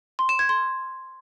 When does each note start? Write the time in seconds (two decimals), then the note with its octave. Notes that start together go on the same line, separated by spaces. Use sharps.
0.19 C6
0.29 E7
0.39 G#6
0.49 C6